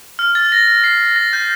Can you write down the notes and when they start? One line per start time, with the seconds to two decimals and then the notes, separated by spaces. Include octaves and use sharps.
0.19 F6
0.35 A6
0.52 A#6
0.67 A#6
0.84 C7
1.16 A#6
1.33 G6